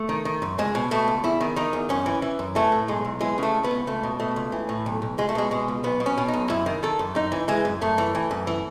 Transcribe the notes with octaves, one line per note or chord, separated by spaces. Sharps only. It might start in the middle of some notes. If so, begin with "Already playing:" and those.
Already playing: A3
D#3
D#3
F#2
C#2 G#3
B2
B2 A3
C#2
E2 E4
D#3
D#3 D#4
E2
F#2 C#4
E3
E3
F#2
E3 A3
A2
B1 G#3
B1
E3 G#3
C#3 A3
C#2
B3
C#2
C#2 A3
B2
B2 A3
C#2
E3
A2
B1
B1
C#2 G#3
A3
B2 G#3
B2 G#3
C#2
B1 B3
B2
C#4
B2
D#4
B1
F#2 E4
D#3
D#3 A4
F#2
F#2 D#4
E3
E3 G#3
F#2
F#2 A3
E3
E3
F#2
E3